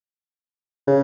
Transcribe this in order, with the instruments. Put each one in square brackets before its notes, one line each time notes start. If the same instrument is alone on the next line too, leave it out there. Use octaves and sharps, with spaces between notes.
[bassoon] C#3